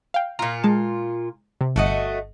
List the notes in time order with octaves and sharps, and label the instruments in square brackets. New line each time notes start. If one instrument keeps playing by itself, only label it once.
[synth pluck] F5 G5
[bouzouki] A#2 F4 [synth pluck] A#5
[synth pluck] G#3 A5
C3
[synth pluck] G1 [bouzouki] A3 F#4 D#5